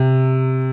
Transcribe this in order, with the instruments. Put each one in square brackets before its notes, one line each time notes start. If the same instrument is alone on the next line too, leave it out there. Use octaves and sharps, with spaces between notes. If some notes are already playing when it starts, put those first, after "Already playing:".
Already playing: [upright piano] C3